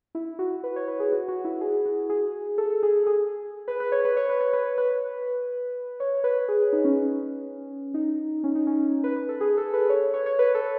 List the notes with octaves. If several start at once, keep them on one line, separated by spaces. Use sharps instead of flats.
E4
F#4
B4
C#5
B4
G#4
F#4
F#4
E4
G#4
F#4
G#4
A4
G#4
G#4
B4
B4
C#5
B4
C#5
B4
C#5
B4
B4
C#5
B4
G#4
D#4
C#4
D#4
C#4
D#4
C#4
B4
B4
A4
G#4
A4
B4
C#5
C#5
C#5
B4
A4